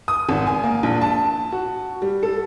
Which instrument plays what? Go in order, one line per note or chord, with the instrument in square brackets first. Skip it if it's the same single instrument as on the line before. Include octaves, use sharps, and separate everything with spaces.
[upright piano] D#6
G#1
G#5
A#3
A#1
A5
F#4
G3
A4